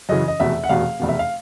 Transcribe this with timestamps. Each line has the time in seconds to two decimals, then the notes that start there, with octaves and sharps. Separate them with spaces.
0.09 F#2 C#3 E3 D#5
0.28 D#5
0.40 F1 E2 B2 E5
0.64 F#5
0.69 F1 E2 B2 F5
1.00 F1 E2 B2
1.09 E5
1.19 F5